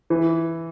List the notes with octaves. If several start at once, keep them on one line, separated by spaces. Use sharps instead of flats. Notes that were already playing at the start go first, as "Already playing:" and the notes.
E3